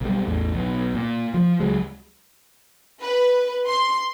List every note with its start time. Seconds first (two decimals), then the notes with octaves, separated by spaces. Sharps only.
0.01 B1 G3
0.27 A1 E2
0.54 B1
0.95 A#2
1.34 F3
1.60 C#2 F#3 G#3
3.03 B4
3.66 C6